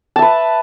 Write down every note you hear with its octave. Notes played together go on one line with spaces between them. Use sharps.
B4 E5 A5